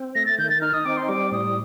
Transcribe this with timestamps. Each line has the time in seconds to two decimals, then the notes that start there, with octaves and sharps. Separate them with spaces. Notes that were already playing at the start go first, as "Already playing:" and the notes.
Already playing: C4
0.15 A3 A#6
0.26 A6
0.38 D#3 G6
0.50 A6
0.61 D#4 F6
0.73 D#6
0.85 C4 D6
0.97 C6
1.09 G3 D6
1.32 A2 D#6